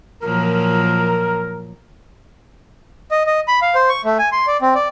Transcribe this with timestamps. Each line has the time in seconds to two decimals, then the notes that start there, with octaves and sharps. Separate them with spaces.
0.23 A#2 F3 F#3 A#4
3.11 D#5
3.27 D#5
3.48 B5
3.62 F5
3.75 C5
3.89 C#6
4.05 A3
4.19 G#5
4.32 C6
4.47 D5
4.61 C4
4.75 D5